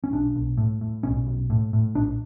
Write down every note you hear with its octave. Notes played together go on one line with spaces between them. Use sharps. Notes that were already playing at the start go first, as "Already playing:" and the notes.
C#4
B1 D4
B1
A2
A2
B1 C#4
B1
A2
A2
A#1 D4